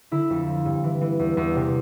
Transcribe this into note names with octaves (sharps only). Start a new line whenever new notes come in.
D3 E4
F2
F3
G2
E3
E3
E2
E2
C3